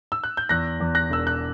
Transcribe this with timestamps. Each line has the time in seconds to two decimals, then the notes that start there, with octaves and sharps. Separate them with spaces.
0.12 E6
0.24 F#6
0.37 G6
0.49 E2 F#6 A#6
0.80 E2
0.95 F#6 A#6
1.10 E1 E6
1.27 F#6